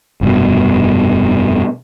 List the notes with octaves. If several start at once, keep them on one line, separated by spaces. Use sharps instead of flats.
F1 G2 B2